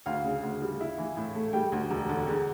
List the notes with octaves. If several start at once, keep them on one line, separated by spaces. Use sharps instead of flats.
D2 F5
C#3
D2
G3
E4
E3
A2
A3
G3 G5
D2
E1
D3
E2